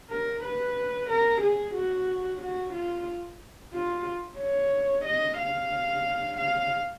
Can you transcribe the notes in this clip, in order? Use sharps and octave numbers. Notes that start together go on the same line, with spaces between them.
A#4
B4
A#4
G#4
F#4
F#4
F4
F4
C#5
D#5
F5
F5